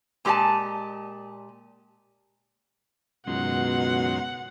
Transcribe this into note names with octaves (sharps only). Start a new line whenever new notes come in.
A#2 G#3 G4 D5 G#5 A5
C#2 F#2 B2 D#3 F#5 C6